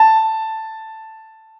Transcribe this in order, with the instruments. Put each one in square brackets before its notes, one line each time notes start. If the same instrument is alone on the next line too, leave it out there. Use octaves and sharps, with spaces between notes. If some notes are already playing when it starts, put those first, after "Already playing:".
Already playing: [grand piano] A5